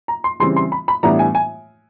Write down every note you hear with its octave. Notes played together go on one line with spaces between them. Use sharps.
A#5
C6
C#3 E3 G3 C4 E4 C6
C6
B5
B5
A2 E3 G3 B3 D4 A#5
G#5
G#5